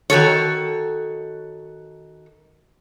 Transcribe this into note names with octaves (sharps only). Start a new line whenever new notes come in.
D#3 F#4 A4 C#5